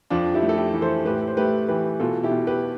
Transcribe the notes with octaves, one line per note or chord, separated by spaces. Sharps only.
F2 D4 F4
E4 G4
A3
A4
E4 G4
E3
A4 C5
A2 G4 B4
C5
A3 G4 B4
E3 G4 B4
B2 F4 A4
E4 G4
B2
G4 B4